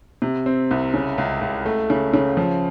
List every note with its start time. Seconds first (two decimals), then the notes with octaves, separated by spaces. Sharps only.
0.22 C3
0.46 C4
0.71 C2
0.94 C#3
1.18 C#2
1.41 C#2
1.66 A3
1.90 C#3
2.14 C#3
2.37 F3